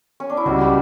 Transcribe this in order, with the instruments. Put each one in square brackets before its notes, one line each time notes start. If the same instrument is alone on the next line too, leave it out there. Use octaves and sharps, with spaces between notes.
[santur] C#4
D4
E4
[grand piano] C#2 C#3 G3 [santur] F#4
[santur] G4